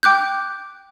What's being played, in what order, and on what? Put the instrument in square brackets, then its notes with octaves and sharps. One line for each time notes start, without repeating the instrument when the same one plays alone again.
[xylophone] G5 D6 F#6 G6